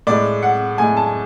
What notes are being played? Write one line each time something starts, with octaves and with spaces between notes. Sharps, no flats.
A2 G#3 D5
F#5
A2 G#3 G#5
A5